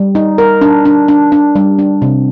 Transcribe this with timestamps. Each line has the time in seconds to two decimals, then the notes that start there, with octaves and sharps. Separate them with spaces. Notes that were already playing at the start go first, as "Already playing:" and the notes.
Already playing: G3
0.15 D#4
0.38 A#4
0.61 D4
0.85 D4
1.08 D4
1.32 D4
1.55 G3
1.79 D4
2.02 C3